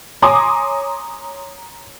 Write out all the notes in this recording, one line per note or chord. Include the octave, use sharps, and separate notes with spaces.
C#5 G#5 A#5 C6 D6 D#6